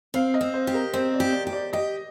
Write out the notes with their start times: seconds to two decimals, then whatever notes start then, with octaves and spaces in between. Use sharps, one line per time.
0.14 C4 F5
0.34 D#5
0.41 C4
0.54 C5
0.67 G4
0.74 A#4
0.93 C4 C5
1.14 D5
1.20 G4
1.33 D5
1.47 G4
1.53 D5
1.73 G4 D#5